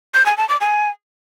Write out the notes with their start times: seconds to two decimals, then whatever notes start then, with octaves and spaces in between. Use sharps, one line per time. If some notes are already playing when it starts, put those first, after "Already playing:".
0.14 G6
0.26 G#5
0.37 A5
0.49 D6
0.61 G#5